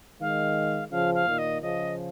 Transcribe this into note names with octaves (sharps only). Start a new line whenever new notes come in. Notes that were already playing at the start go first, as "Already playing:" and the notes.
D#3 G#3 F5
C#3 F3 F5
F5
A#2 D#3
D#5
C#3 F3 D#5